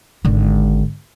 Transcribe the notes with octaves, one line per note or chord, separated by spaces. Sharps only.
G#1 D3